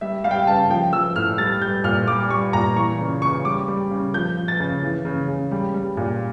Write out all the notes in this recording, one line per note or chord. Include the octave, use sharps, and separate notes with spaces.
G3 E5
G3 F5
G5
F5
C#3 A5
F3 G5
F3 E6
A2 F6
G3 A6
G3 G6
A#2 F6
G3 D6
G3 C#6
A#2 A#5
E3 C#6
C#3
C#3 C#6
G3 D6
G3
C#3
F3 G6
F3
A6
C#3
E3
C#3
C#3
G3
G3
A#2